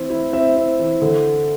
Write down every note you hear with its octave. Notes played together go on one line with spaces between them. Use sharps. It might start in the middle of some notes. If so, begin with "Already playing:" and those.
Already playing: E3 C4
E4
C4 E5
C4
E3
D3